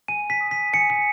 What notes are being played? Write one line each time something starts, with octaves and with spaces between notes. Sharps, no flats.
G#5 D#7
B6
D#6
B6
G#5 C#7
C#7